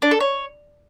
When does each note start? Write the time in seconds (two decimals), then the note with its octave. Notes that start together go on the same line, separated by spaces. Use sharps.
0.02 D4
0.11 A4
0.20 C#5